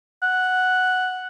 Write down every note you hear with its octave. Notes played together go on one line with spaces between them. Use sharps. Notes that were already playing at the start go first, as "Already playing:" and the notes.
F#5